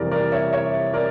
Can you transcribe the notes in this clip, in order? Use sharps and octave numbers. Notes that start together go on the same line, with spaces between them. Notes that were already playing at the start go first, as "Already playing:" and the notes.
Already playing: F1 F2 E3 G3 A#4 D5
A#4 D5
C#5 E5
C#5 E5
A#4 D5